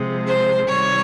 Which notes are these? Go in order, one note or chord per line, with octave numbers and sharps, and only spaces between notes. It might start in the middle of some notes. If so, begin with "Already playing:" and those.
Already playing: C3 F3 G#3
C5
C3 D#3 G3 C#5